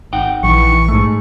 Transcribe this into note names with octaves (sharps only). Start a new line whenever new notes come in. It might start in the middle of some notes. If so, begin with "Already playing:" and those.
G#1 D#4 F#5 G5
A#1 E3 C#6
G#2 A3